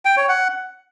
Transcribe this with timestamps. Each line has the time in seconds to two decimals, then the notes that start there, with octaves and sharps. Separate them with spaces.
0.05 G5
0.17 C#5
0.29 F#5